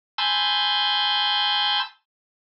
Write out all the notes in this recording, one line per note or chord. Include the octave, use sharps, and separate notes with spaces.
G#5 A5 B5 C6 E6 G6